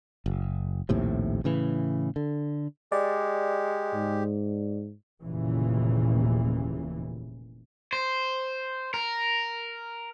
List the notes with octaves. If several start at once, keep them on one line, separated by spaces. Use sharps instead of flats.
F#1
A#1 D#2 A2 C3
A2 C#3 E3
D3
G#3 G4 D5
G#2
F1 D#2 A#2 C#3 E3
C5
A#4